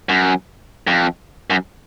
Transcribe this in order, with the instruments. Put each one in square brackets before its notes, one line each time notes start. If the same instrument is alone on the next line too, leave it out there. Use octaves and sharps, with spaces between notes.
[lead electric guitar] F#2
F2
F#2